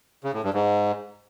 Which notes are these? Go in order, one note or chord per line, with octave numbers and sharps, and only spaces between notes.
C#3
A2
G2
G#2